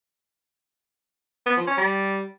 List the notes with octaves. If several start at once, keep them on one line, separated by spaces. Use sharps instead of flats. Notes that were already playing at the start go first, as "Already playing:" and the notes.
B3
F3
C#4
G3